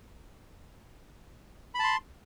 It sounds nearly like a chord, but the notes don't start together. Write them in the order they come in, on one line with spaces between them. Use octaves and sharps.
B5 A5 C6